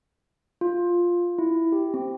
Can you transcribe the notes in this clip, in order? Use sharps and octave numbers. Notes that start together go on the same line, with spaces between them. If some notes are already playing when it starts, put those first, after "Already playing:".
F4
E4
G4
C4